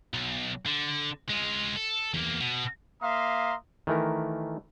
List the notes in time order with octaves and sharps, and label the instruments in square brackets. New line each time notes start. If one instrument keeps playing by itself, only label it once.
[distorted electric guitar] B1
D3
G#3 F4
A4
E2 A#3
B2
[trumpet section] A#3 E5 F5 A#5 C6 D#6
[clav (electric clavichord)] D#3 E3 A3 A#4